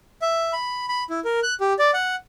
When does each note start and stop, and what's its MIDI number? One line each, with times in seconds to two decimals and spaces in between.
0.22 0.53 76
0.53 0.86 83
0.89 1.04 83
1.10 1.20 64
1.25 1.40 70
1.43 1.54 90
1.60 1.73 67
1.79 1.91 74
1.94 2.15 78